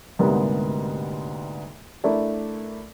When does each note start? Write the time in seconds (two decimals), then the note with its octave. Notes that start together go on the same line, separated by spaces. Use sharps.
0.19 D2 G#2 C3 G3 A#3 B3
2.04 A3 D4 E4 A#4 D5